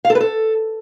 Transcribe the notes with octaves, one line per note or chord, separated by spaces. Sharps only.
F5
A4
B4
A4